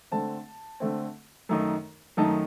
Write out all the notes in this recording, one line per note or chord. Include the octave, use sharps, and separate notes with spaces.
D3 A3 C4 A5
D3 A3 C4
F#2 D#3 A3 D#4
F#2 D#3 A3 D#4 A5